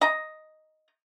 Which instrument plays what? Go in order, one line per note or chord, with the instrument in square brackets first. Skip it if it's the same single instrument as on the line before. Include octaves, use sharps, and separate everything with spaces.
[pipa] D#5 A#5